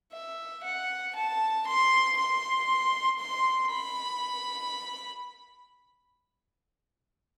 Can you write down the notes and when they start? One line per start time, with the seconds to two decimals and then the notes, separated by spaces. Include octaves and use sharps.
0.13 E5
0.64 F#5
1.15 A5
1.67 C6
2.18 C6
3.19 C6
3.71 B5